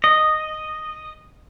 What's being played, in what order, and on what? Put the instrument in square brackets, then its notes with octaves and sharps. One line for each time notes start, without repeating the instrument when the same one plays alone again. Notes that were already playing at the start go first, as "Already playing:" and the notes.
[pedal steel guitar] D#5